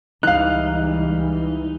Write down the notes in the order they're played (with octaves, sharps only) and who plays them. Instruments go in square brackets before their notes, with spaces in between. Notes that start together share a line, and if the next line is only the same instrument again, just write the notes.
[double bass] C#2 G3 [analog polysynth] E3 [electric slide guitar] D#4 [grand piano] F5 F#6